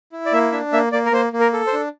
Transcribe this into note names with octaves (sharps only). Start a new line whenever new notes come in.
E4
D5
A#3 E5
D4 E5
A#3 E5
A#3 D5
A#4
A#3 C5
A#3
A#4
A4
C5
D4